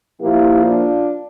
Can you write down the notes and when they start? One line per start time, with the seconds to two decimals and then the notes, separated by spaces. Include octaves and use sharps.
0.21 A#2 F3 A#3 E4 G4
0.65 D4 F4